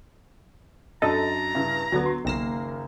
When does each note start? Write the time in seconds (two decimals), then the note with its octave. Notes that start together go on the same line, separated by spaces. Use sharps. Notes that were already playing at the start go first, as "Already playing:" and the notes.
1.02 F#2 D4 A4 D#5 A#5 A6
1.55 G2 C#3 E4
1.92 D2 D3 F#3 B3
2.06 C6
2.25 F#1 B1 D#3 A#3 A#6 C7 E7